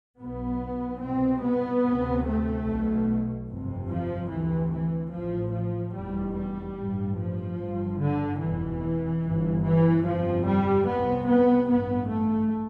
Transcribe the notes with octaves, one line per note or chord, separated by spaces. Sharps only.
B1 B2 B3
C2 B2 C4
B3
D2 C3
A3
B1 B2
G1 F2 C3
F3
D2 C3 E3
E3
A1 A2 F3
F3
F1 E2 B2 G3
G3
A1 G2
F3
G1 G2
D3
F1 E2 B2 E3
G1 G2
E3
G1 F2 C3 F3
G3
C2 C3 B3
B3
A1 G2 B3
A3